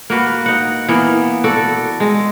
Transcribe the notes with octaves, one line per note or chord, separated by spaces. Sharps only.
A#3 F#4 B4
D#4 F#5
E3 A#3 B3
F#4 A4 D5
G#3